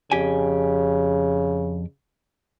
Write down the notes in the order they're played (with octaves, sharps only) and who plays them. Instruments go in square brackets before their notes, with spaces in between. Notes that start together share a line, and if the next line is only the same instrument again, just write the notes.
[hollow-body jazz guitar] F2 G4 G#5 [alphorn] C#3